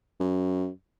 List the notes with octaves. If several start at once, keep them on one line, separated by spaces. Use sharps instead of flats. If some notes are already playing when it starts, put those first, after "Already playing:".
F#2